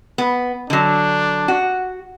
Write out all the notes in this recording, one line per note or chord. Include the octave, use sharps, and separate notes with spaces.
B3
D3 F#3 D4
F#4